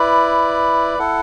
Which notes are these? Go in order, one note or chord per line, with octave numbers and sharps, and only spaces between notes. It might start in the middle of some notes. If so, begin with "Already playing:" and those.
Already playing: E4 B4 D5
E4 A4 F#5